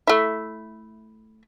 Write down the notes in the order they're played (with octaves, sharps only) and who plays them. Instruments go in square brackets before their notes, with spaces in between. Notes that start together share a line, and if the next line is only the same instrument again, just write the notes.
[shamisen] A3 E4